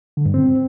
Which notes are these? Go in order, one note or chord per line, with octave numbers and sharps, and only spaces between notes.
D3
G2
C4